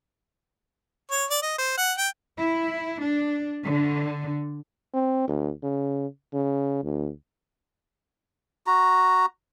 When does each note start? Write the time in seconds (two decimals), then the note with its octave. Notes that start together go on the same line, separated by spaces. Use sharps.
1.11 C#5
1.30 D5
1.42 D#5
1.58 C5
1.77 F#5
1.98 G5
2.38 E4
3.03 D4
3.66 D3
4.94 C4
5.28 D2
5.63 C#3
6.33 C#3
6.84 D2
8.67 F#4 A#5